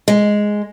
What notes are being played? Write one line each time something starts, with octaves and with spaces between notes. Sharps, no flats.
G#3